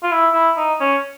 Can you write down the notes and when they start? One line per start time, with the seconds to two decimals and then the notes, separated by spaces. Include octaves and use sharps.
0.03 F4
0.12 E4
0.34 E4
0.57 D#4
0.80 C#4